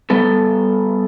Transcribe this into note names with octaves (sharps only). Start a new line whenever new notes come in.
G3 B3 A4